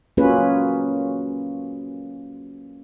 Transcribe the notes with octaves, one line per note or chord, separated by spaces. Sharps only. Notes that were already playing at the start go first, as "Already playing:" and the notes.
F#3 A#3 C#4 F4 G#4 B4